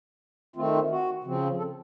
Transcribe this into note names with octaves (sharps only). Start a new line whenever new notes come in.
D#3 A3 C4 F4
F4
F#4
C#3 F3 C4
A4